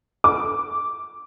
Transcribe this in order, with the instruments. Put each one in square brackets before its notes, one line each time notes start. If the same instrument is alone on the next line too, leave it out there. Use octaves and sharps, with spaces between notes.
[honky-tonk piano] D6